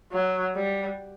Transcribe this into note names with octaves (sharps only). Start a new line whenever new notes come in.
F#3
G3